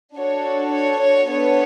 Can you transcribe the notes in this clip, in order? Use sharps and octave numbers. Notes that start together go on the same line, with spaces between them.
D4 F#4 A4 C#5
C#5
C#5
B3 D4 A4 C#5